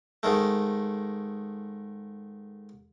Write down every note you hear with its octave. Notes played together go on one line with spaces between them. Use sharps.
G#2 D#3 A3